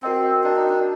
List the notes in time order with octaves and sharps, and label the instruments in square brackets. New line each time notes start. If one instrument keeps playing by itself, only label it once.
[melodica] C4 [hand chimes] F#4 A#4 D#5 G5
[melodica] D4 [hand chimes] F#4 A#4 D#5 G5
[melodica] D#4
D4